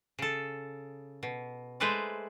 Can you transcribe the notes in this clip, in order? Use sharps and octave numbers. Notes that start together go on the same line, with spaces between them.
C#3 A4
B2
G#3 A3 B4 C5 D5